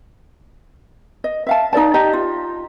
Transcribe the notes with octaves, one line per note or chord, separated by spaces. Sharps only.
D#5
E5 F5 A5
D#4 A#4 D5 A5
G4 D#5 A5 A#5
F4